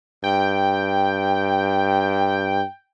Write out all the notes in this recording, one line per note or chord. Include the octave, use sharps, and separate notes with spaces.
G2 G5